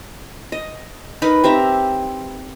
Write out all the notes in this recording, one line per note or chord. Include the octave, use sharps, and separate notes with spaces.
D#5
D#4 A#4 B4 B5
C4 G4 E5 A#5